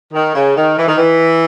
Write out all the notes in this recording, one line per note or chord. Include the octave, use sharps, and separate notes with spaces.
D#3
C#3
D#3
E3
D#3
E3